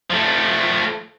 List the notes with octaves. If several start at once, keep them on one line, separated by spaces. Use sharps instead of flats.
F3 A3